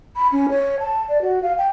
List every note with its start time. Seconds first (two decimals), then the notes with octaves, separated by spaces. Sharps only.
0.16 B5
0.32 C#4
0.49 C#5
0.80 A5
1.09 D5
1.22 F#4
1.43 F5
1.58 G5